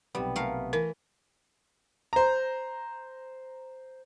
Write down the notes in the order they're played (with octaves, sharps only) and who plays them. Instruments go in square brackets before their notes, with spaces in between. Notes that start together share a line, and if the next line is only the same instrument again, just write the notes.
[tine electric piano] B1 C3 B3 [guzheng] G3
[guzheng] A3 A#4 F5
[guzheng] E3 [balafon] A#4
[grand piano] C5 A#5